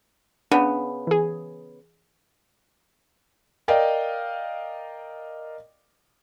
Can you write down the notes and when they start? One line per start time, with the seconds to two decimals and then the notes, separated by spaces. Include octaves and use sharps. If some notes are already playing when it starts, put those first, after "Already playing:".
0.51 C#3 B3 D4
1.07 E3 G#4
3.68 A#4 D5 D#5 F5 G5